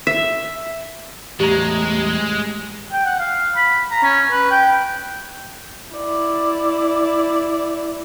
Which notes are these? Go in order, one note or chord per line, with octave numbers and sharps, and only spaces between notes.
E5
E2 A2 G3 G#3 G4 A#5
G5
F#5
F5
B5
A#5
C#4
B4
G5
E4 D5